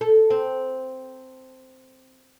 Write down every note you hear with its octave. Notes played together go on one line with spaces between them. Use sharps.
A4
C4